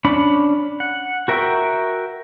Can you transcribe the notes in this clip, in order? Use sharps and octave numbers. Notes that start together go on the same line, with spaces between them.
C#4 D4 B5
F#5
F#4 A#4 E5 G5 C#6